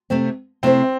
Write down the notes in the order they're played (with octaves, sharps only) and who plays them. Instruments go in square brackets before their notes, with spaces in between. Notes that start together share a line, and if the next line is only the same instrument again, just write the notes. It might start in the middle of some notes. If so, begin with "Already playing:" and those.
[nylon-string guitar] C3 A3 C4
[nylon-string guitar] C3 A3 E4 C5 [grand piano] C4